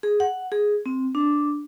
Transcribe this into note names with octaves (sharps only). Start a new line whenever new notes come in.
G#4
F#5
G#4
C4
D4